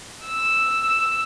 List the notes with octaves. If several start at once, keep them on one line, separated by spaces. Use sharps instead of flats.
E6